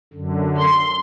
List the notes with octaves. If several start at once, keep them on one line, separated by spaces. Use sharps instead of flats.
F#2 D3
C6